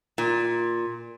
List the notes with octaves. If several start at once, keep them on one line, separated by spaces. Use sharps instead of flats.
A#2